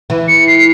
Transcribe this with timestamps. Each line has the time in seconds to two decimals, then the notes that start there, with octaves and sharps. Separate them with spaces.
0.10 E3
0.28 C#7
0.47 C7